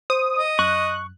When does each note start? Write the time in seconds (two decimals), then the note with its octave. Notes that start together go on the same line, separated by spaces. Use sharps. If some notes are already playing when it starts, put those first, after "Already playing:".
0.10 C5 D#6
0.37 D#5
0.59 F#2 C#6 F#6